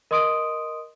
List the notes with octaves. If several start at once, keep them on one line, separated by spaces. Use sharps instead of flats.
A#4 D#5 C6 D#6 D7 D#7